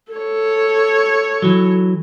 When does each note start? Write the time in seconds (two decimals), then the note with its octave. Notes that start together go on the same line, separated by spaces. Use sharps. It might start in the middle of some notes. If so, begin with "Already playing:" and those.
0.12 A4 C#5
1.42 E3 F#3